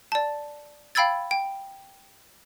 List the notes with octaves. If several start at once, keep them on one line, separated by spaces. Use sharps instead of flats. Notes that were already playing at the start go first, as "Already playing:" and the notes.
D5 A5
F5 G5 B5 E6 G#6 A6
G5